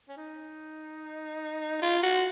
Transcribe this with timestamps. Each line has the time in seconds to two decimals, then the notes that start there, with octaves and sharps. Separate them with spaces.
0.09 C#4
0.17 D#4
1.82 F4
2.03 F#4